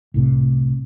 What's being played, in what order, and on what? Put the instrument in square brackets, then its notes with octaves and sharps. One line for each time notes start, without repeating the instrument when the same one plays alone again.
[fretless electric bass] C2 A2 C3